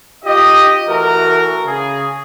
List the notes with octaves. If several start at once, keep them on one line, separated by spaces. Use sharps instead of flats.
D#4 F4 G4 D#5
E3 A3 F#4 A4 A#4
C#3 G#4